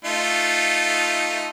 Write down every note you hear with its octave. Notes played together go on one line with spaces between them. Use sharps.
A3 D#4 F4